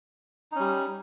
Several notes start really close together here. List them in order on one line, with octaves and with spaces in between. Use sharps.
D#4 C#4 G3